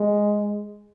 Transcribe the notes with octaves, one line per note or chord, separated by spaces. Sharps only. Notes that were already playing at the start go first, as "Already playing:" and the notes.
Already playing: G#3